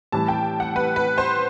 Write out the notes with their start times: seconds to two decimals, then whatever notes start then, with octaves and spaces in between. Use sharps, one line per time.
0.12 A2 E3 G3 A5
0.28 G5
0.60 F#5
0.76 B4
0.96 B4
1.18 C5